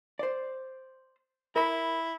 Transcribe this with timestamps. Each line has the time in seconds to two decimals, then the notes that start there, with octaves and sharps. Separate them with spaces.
0.19 C5 D5
1.56 E4 A#4 B5